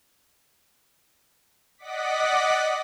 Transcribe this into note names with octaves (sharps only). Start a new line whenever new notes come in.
D5 D#5 F#5 D6 B6